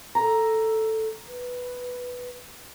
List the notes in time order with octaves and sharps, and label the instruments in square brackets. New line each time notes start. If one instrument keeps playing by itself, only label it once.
[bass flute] A4 [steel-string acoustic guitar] A#5
[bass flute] B4